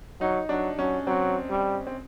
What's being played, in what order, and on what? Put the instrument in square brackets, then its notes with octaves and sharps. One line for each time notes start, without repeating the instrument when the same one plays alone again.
[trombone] F#3 [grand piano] D#4
[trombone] F#3 [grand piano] D4
[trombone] F#3 [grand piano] C#4
[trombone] F#3 [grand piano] C4
[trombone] G3
[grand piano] C4